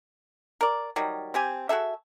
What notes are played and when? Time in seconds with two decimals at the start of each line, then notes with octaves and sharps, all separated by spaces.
0.61 A#4 D5
0.96 D#3 F#3 G3
1.34 C4 G4 G#5
1.69 F#4 G#4 A4 E5